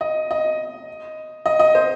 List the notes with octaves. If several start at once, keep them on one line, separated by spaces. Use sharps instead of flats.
D#5
D#5
D#5
D#5
C5